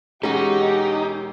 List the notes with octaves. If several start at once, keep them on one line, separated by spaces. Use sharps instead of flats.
E1 G#3 C#4 D#4 F#4 G4